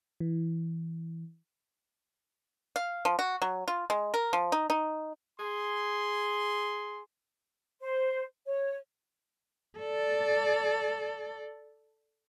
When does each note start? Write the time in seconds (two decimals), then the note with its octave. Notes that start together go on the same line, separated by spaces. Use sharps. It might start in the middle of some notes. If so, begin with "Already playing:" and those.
0.20 E3
2.76 F5
3.05 F3
3.19 F#4
3.42 F#3
3.68 F4
3.90 G#3
4.14 A#4
4.33 F3
4.52 D#4
4.70 D#4
5.40 G#4 C6
7.81 C5
8.46 C#5
9.79 A4 D5